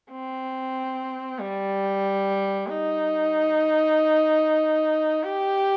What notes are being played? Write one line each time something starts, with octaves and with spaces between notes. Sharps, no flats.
C4
G3
D#4
G4